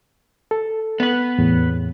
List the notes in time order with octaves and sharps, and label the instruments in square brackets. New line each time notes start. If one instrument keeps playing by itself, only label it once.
[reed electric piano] A4
[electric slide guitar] B3 B4
[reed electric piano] E2 A2